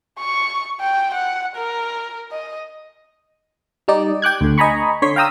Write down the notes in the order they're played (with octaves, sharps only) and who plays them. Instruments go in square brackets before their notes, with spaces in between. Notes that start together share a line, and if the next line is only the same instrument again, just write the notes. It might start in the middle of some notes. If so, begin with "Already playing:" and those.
[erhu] C#6
G5
F#5
A#4
D#5
[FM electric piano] G3 D#4 D5
G5 D6 F#6 G#6
D2 D3
D#5 G#5 A#5 B5 C#6
D3 C#5 C6 C#6 B6
F5 G5 A#5 D#6 E6